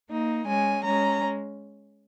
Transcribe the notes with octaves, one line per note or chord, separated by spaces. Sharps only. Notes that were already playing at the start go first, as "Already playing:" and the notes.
A#3 D#4
G#3 C#4 G#5
G#3 C#4 A#5